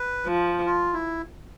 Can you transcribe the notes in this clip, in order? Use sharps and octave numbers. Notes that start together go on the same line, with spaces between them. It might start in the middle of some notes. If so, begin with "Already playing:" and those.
Already playing: B4
F3
F4
E4